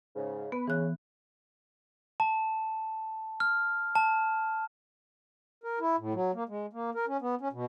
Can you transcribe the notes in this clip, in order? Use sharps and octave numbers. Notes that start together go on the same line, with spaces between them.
G#2 C#3
B3 B4
C#3 E3 F#6
A5
F6
A5
A#4
E4
A2
F#3
A#3
G#3
A#3
A#4
C#4
B3
C#4
B2